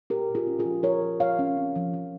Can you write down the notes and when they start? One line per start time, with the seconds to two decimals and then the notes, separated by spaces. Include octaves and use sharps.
0.10 A#2 G4 A#4
0.29 A#2
0.35 F4 G#4
0.47 C#4
0.59 F4 G#4
0.65 F3
0.83 F3 A#4 C#5
1.02 F3
1.20 F3 C#5 F5
1.39 C#4
1.57 C4
1.76 F3
1.94 F3